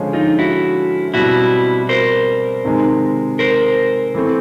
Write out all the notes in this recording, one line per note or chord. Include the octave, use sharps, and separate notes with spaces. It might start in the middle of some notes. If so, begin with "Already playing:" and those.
Already playing: D3 F3 G#3 C#4
D#4 F4
E4 F#4
B2 G3 C4 E4 F#4
A#4 C5
C3 D#3 G#3
A#4 C5
E3 A3 C4